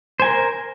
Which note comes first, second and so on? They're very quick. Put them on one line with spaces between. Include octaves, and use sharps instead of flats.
C5 G#5 A#4